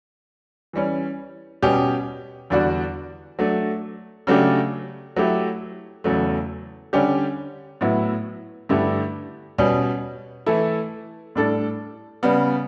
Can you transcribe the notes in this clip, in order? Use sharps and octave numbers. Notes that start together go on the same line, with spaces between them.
E3 G3 C#4
B2 G3 C#4 G4
E2 D3 G3 D4 F#4
F#3 A3 D4
C#3 F#3 A3 D4 G4
F#3 A3 E4 G4
E2 C#3 F#3 A3
D3 G3 C#4 G4
A2 F#3 B3 E4
G2 D3 A3 E4 G4
B2 G3 C#4
E3 A3 E4 A4
A2 G3 D4 A4
C#3 G3 B3